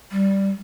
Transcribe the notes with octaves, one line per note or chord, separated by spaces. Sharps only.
G3